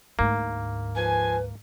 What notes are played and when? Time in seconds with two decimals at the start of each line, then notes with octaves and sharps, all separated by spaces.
0.19 D2 G#2 A#3
0.96 F3 B4 G#5